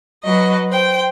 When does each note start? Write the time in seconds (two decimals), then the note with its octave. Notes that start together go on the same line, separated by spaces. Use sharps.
0.25 F#3 F#4 B4 D#5
0.68 C5 G5